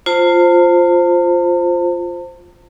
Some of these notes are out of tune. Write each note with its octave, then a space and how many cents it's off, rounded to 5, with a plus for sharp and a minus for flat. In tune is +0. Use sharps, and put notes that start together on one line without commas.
F4 +0 C5 +0 A5 +45